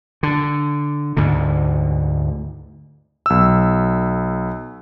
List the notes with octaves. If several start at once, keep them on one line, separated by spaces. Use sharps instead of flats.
D3
D2 G#2 D3
B1 E6